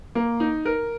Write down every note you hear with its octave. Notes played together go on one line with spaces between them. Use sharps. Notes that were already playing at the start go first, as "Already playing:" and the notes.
A#3
D#4
A#4